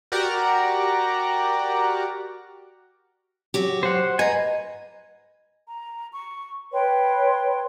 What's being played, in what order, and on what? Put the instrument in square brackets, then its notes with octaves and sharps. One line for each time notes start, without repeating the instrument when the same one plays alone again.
[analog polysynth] F#4 G4 A#4 D5 F#5 A#5
[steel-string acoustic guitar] F#3 F#4 G4
[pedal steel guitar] C5 F#5
[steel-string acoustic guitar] B4 [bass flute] D#5 [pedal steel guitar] G#5 A#5
[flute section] A#5
C#6
B4 C#5 G5 C6